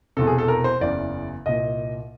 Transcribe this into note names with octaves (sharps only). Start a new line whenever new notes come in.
E1 E2 C3 A4
G#4
A4
A#4
C5
F#1 E2 C#3 E3 D5
C2 A#2 D#5